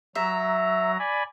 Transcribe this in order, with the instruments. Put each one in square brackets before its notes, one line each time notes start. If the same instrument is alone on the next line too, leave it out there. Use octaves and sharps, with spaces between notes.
[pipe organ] F#3 A#5 [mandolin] E5
[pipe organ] D5 G#5 B5